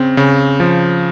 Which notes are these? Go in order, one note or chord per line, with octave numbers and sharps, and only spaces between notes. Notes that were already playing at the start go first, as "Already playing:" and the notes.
Already playing: C#3 C4
C#3
F3